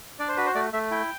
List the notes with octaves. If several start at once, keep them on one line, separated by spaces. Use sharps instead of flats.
D4 D5
C5
F#4 B4
C5
A3 D5
A3 E5
E4 G5